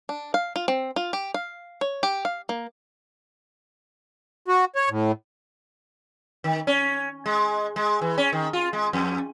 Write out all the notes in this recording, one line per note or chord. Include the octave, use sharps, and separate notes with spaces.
D4
F5
F4
C4
F4
G4
F5
C#5
G4
F5
A#3
F#4
C#5
A2
D#3
C#4
G#3
G#3
E3
C#4
D#3
F4
G#3
F2